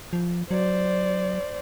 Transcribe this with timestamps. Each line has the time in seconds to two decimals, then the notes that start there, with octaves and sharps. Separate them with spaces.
0.13 F3
0.51 F#3 C5 D5